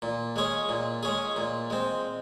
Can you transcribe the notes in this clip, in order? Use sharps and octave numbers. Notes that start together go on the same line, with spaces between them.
A#2
G#3 C#4 G#4
A#2
G#3 C#4 G#4
A#2
G#3 C4